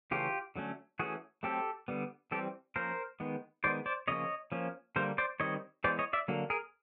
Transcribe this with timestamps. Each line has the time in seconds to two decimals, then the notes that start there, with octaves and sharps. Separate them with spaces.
0.11 C#3 E3 A3 C#4 F4 G4
0.56 D3 F#3 A3 C#4
0.99 E3 A3 C#4 F#4 G#4
1.43 F#3 A3 C4 G4 A4
1.88 D3 G3 B3
2.31 E3 G3 C4 G4 A4
2.76 F3 A#3 C#4 A#4 C5
3.20 D#3 G#3 B3
3.64 D#3 G#3 B3 C5 D5
3.86 C5 D5
4.08 C#3 F3 A#3 C#4 C#5 D#5
4.52 F3 A#3 C#4
4.96 D3 G3 A#3 A#4 C5
5.18 C5 D5
5.40 D#3 G3 C4 C#5 D#5
5.84 E3 G#3 B3 C5 D5
5.99 C#5 D#5
6.13 D5 E5
6.28 D3 F#3 A#3
6.50 G#4 A#4